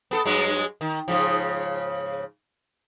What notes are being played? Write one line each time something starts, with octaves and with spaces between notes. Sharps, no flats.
B3 G#4 A4
G2 F#3 G#3
D#3
G#2 C#3 F3